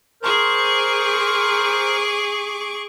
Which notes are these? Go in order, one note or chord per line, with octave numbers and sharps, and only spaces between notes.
G#4 A#4 C5 C#6 D6